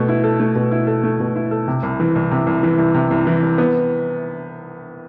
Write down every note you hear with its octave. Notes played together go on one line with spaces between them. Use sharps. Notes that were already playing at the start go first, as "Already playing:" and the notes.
Already playing: B2 A3
E4
A4
A3
B2
E4
A4
A3
B2
E4
A4
C3
C2
E3
C2
C3
C2
E3
C2
C3
C2
E3
C2
B3